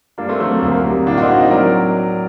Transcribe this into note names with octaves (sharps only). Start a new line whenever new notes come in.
G2 A#3 D4
A3 C4
F#3 A3 C4
A#3
D2 A#3
A#3
C3
A2 A#3 D4
F#4
C4 D#4
A2
D#5
F#3 A#4 D5